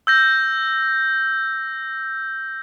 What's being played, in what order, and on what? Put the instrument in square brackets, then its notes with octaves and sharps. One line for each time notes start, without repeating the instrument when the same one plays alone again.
[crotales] E6 G6 A#6